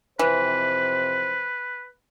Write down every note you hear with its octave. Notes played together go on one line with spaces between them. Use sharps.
F2 C3 E3 B4 C5